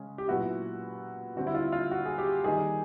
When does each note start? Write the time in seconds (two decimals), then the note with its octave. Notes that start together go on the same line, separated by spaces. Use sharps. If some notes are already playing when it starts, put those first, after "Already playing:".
Already playing: C#3 G#3 C#4
0.18 G4
0.28 A#2 F#3 B3 E4 F#4
1.36 D3 G3 C4 F#4
1.47 E4
1.54 F4
1.72 F4
1.91 F#4
2.05 G#4
2.18 G4
2.44 D#3 G3 A#3 D#4 G#4